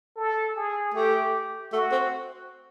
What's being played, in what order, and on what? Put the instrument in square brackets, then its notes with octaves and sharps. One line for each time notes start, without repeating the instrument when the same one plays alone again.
[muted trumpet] A4
G#4
[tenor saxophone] A3 [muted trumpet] G4
[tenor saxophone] A3 [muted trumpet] F#4
[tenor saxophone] C4